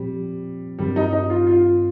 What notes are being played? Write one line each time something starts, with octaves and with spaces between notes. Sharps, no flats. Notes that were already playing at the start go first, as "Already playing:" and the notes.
Already playing: A#2 F3 G3 C4
G2 D#3 G3 C4
D#4
D#4
F4
F4